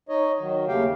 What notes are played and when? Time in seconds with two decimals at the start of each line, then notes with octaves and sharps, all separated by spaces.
0.09 D#4 C#5 D#5
0.39 D#3 F#3
0.68 D#2 C#3 A3 G4 F5 G5